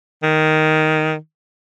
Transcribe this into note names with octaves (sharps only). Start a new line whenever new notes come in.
D#3